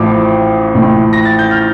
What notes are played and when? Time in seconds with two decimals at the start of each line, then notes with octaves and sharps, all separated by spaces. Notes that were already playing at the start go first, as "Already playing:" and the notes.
Already playing: A1 A2 F3 D6
0.75 A1 A2 F3
1.13 A#6
1.25 A6
1.39 G6
1.51 F6